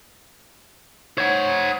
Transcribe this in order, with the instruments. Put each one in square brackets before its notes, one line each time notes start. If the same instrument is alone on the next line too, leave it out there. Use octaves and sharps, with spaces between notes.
[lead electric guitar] C5 F#5 [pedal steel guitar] C#5